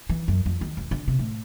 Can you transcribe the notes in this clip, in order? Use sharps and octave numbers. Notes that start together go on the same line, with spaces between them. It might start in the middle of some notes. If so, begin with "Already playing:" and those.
E3
F#2
F2
D#3
E1
D3
C3
A2